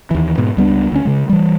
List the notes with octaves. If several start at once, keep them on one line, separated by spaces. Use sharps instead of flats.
D#2 E3
G#2 B2
C#2 G3 B3 D4
D2 C#4
C#3 G#3
E3 G3